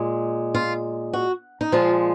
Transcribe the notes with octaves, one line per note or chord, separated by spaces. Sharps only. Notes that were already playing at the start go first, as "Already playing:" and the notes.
Already playing: A#2 G#3
F4
F#4
D#4
A#2 F3 G#3 F4